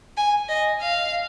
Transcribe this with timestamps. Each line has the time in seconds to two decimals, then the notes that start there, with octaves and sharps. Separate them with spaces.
0.17 G#5
0.49 D#5
0.81 F5